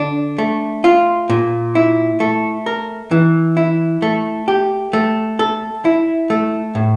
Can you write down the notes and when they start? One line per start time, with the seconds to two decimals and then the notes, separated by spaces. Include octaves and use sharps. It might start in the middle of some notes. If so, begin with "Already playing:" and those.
Already playing: D3 D4
0.38 A3
0.84 F4
1.30 A#2
1.75 E4
2.20 A3
2.66 A#4
3.11 E3
3.57 E4
4.02 A3
4.48 G4
4.93 A3
5.39 A4
5.85 E4
6.30 A3
6.75 A2